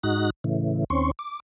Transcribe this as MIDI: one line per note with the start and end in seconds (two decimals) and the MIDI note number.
0.03 0.30 44
0.03 0.30 63
0.03 0.30 66
0.03 0.30 90
0.03 0.30 94
0.44 0.84 45
0.44 0.84 49
0.44 0.84 52
0.90 1.11 39
0.90 1.11 60
0.90 1.11 61
0.90 1.11 84
0.90 1.11 85
1.19 1.40 86